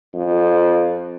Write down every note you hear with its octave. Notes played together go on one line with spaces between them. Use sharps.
F2